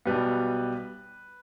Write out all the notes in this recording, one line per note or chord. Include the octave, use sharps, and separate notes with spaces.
B1 B2 G3 B3 B4